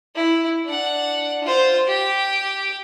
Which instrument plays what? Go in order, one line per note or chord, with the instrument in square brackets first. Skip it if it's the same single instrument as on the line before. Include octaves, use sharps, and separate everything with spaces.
[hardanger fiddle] E4
D4 F#5
F4 C5
G4 G5